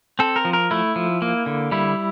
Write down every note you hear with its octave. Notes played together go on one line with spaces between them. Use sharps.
C4 A4
A#4
F3
A#4
A3 E4
F3
A#3
D3
G3 E4